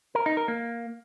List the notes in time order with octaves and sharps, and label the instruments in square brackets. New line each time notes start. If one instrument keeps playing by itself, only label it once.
[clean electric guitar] A#4
D#4
A#4
A#3